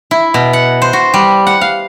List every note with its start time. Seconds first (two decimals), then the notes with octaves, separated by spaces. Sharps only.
0.11 E4
0.34 B2
0.53 F#5
0.82 C5
0.93 F#4
1.14 G3
1.47 F#5
1.61 F5